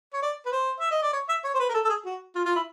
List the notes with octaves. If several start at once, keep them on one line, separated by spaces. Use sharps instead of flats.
C#5
D5
B4
C5
E5
D#5
D5
C#5
E5
C#5
C5
B4
A#4
A4
A4
G#4
F#4
F4
F4
E4